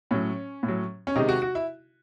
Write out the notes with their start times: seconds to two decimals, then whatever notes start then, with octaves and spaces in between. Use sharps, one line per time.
0.11 A2 F#3 C#4
0.63 A2
0.68 F#3
1.07 C#4
1.16 C3 D#3 G#3 D#4
1.29 F#4
1.42 F#4
1.55 E4